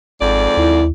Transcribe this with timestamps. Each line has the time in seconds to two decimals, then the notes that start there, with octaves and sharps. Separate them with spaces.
0.21 G#1 F2 G#2 D5
0.57 D#2 E4